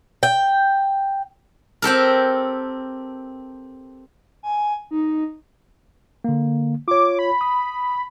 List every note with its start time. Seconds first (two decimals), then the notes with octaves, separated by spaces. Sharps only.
0.23 G5
1.82 C4 G4 A4 A#4
4.43 G#5
4.91 D#4
6.24 D3 A#3
6.88 F4 C#5 D6
7.19 B5
7.41 D#6